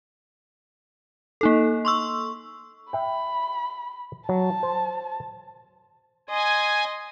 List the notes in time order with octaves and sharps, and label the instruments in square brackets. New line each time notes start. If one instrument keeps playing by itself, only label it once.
[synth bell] A#3 D#4 A4
C6 C#6 E6
[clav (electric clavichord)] E5 G5 [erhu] B5
[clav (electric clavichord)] F#3 [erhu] A5
[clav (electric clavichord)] C5
[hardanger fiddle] D#5 C6 [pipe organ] G#5